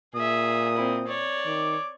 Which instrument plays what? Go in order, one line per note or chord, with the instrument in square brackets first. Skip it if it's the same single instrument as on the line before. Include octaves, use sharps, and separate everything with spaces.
[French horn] A#2 [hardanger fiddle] G#4 E5 [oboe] D#6
[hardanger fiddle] C4 E4
C#5 D5
[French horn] D#3 [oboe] D6